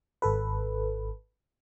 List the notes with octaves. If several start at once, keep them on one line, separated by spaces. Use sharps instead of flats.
G#1 A4 B4